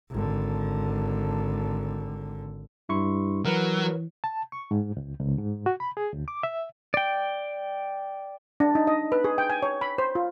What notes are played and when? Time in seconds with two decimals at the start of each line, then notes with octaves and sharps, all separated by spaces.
0.10 G#1 D3
2.89 G2 E4 C6 C#6
3.45 E3 F#3 A#4 B4
4.24 A5
4.52 C#6
4.71 G#2
4.97 C#2
5.20 C#2
5.39 G#2
5.66 F#4
5.80 B5
5.97 G#4
6.13 D2
6.28 D6
6.43 E5
6.94 D5 G5
8.60 D4
8.75 D#4
8.87 D#5
9.12 B4
9.24 G#4
9.38 G5
9.50 G#5
9.63 C#5
9.81 B5
9.98 C5
10.15 F4